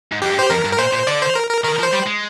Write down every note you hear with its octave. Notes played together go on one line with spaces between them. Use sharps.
G#2
F2 G4
G2
C5
F2 A#4
G2
A#4
A#2 C5
A#2
D3 D5
C5
A#4
A#4
D#3 A#4
F3
C5
G3
G#3